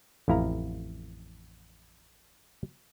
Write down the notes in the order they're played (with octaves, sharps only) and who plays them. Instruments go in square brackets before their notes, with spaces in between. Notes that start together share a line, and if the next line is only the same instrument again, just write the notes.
[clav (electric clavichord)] A1 F2 E4 F5 A#5